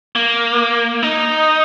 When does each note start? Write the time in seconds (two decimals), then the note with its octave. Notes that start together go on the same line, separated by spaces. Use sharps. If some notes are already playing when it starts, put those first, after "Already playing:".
0.15 A#3
1.03 D#4